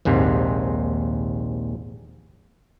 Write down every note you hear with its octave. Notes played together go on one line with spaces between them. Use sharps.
A#1 D#2 G#2 C3